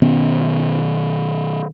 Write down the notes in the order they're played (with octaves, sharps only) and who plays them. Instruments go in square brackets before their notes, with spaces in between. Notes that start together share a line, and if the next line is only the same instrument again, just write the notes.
[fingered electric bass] B2 D#3 B3 C#4